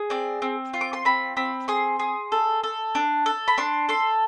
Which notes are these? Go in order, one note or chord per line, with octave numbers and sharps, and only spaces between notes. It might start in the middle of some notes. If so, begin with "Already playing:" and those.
Already playing: G#4
C4 D5
C4
F4
D6
C6
C4 B5
C4 B5
G#4 C6
G#4
A4
A4
D4
A4
B5
D4 C6
A4 C6